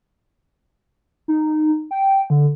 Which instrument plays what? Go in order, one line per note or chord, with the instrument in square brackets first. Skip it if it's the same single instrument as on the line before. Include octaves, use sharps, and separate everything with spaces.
[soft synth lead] D#4
G5
D3